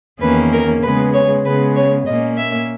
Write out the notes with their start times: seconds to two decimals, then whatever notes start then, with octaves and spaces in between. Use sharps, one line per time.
0.20 E2 D#3 A#3 C#4 B4
0.52 A#4
0.83 C#3 G#3 B3 B4
1.14 C#5
1.45 C#3 G#3 B3 B4
1.76 C#5
2.07 A#2 A#3 C#4 D#5
2.38 E5